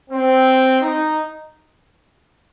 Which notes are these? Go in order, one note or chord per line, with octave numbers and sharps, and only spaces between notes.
C4
D#4